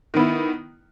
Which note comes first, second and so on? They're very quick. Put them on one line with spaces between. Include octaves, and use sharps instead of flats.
D#3 B3 E4